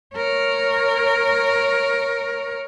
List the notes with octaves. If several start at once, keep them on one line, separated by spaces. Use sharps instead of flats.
A#4 C#5